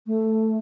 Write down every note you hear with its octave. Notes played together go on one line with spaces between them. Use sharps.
A3